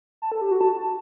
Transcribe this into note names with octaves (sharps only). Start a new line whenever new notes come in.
A5
A4
G4
F#4
A5